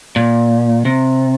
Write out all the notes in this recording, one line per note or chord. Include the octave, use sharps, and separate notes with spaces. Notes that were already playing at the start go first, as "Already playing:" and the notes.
A#2
C3